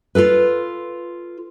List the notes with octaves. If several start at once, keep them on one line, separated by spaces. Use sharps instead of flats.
F4 G#4 A4 B4